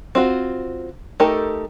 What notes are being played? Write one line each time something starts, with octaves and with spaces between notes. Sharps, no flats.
C4 F4 F#4
A3 D#4 G4 A4 A#4